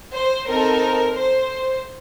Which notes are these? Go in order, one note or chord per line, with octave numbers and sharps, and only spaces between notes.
C5
C4 D#4 A4 A#4
C5